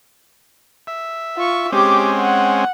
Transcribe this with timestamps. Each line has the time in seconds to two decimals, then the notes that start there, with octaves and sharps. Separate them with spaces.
0.87 E5
1.36 F4 C#6
1.72 G#3 C4 C#4 G4 D6
2.20 F#5